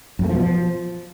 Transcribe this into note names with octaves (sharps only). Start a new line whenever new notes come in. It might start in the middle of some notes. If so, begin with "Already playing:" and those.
F#2
A3
F3
B2
F3